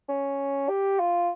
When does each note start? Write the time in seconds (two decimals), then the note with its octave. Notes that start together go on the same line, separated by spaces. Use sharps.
0.09 C#4
0.69 G4
1.00 F4